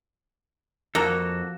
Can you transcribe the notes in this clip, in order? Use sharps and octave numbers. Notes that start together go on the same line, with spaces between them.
F2 A#3 F#4 A4